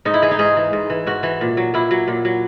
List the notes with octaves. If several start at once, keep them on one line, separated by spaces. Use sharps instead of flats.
G#2 D#4
E4
E3 G#4
D#4
G#2 G#4
E3
G#2
E3
G#2 F#4
E3
A#2
F#3
A#2 E4
F#3
A#2
F#3